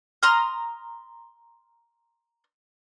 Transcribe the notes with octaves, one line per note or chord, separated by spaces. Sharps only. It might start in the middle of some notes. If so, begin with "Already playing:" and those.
A#5 C6 D#6 F6